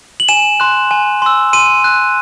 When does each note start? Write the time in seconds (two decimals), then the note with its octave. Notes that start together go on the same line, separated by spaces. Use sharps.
0.20 F#7
0.29 G#5 E7
0.60 C6 F#6
0.91 G#5
1.22 C6 E6
1.53 C6 D#7
1.84 F#6